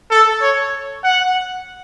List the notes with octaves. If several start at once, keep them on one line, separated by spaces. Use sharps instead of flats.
A4
C#5
F#5